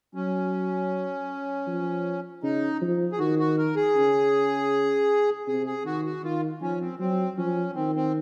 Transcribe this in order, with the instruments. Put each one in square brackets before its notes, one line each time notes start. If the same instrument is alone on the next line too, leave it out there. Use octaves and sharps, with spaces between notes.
[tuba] F#3 [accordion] C#4
[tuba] F3
[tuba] C#3 [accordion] D#4
[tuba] F3
[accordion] G#4
[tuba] D#3 [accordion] F#4
[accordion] F#4
A#4
G#4
[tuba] C#3
[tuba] C3 [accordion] G#4
[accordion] G#4
[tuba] D#3 [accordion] F#4
[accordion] F#4
[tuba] D#3 [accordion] F4
[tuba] F3 [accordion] C#4
[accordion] C4
[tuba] F#3 [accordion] C4
[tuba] F3 [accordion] C#4
[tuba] D#3 [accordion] C4
[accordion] C4